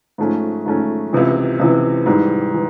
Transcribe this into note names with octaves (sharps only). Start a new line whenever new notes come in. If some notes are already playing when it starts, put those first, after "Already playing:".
G#2 F3 A3 C#4
G#2 F3 A3 C#4
C#2 C3 E3
C#2 C3 E3
G#2 E3 G3
E3